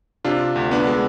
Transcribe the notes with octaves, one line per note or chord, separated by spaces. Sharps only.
C3 D4 F4
D2
B3 D4
G#3